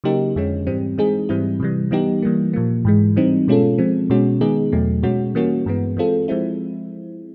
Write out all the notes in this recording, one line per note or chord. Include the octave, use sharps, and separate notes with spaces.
C#3 F#3 A#3 D#4 G4
F2 D3 F3 G#3 C#4
G#2 E3 G3 C4
E3 G#3 C4 D#4 G#4
G#2 E3 G3 C4 E4
C3 E3 G3
E3 G3 B3 D#4 G4
E3 G3 A#3
A#2 F3 A#3
G#2 E3 G#3
E3 G3 C4 D#4
B2 G#3 C#4 F4 A4
F3 G#3 C4
B2 G#3 C#4 F#4
D#3 G#3 B3 D#4 G#4
E2 B2 F#3 A3
B2 G#3 C#4 F#4
E3 G3 A#3 C#4 F#4
G2 E3 G#3 B3
E3 G#3 C4 F4 A4
F3 G#3 C4 E4